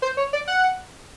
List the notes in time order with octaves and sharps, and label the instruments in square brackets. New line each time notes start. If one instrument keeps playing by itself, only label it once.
[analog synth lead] C5
C#5
D5
F#5